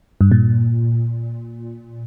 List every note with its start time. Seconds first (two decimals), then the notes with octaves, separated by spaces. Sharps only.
0.21 G2
0.31 A#2